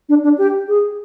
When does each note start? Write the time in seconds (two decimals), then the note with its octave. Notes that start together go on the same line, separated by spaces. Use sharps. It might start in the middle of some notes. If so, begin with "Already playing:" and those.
0.09 D4
0.24 D4
0.38 G4
0.68 G#4